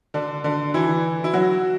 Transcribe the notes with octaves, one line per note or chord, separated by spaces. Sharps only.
D3 D4
D3 D4
E3 E4
E4
F#3 F#4